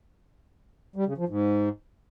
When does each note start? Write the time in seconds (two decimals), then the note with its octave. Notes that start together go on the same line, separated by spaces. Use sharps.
0.96 G3
1.07 C#3
1.18 F3
1.28 G#2